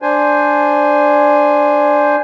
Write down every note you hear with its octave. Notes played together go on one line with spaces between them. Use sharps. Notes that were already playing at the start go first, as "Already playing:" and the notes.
D4 C5 G#5